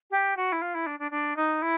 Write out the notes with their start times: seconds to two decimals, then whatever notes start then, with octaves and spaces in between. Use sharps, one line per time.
0.11 G4
0.37 F#4
0.52 E4
0.62 F4
0.74 E4
0.86 D4
0.99 D4
1.11 D4
1.36 D#4
1.62 E4